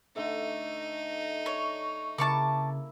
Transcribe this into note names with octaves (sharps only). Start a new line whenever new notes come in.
D3 A3 D#4
C#5 C#6
C#3 A#3 E4 A5 C#6 D6